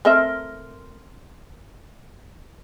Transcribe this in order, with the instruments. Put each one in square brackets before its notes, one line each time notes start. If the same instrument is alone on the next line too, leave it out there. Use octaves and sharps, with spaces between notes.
[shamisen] A3 C4 E5 [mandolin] A#4 C6 F6